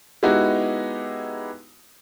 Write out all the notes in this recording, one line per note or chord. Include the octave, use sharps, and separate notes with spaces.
G#3 B3 D#4 E4 F#4 G4